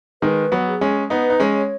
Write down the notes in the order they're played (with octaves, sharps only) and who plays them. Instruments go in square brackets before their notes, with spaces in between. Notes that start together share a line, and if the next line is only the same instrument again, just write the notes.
[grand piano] D#3 G#3 [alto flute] B4
[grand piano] F#3 B3
[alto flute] G#4
[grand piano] G#3 C#4
[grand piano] B3 D#4 [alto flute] B4
[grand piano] D#4
G#3 C#4
[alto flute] C#5